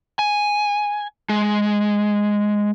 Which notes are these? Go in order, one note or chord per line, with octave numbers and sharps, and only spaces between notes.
G#5
G#3